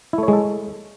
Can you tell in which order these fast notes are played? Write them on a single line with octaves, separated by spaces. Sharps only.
E4 A3 C#5 G#3 A4